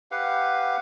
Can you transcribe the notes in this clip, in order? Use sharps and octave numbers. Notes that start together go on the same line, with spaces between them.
G4 B4 F5 F#5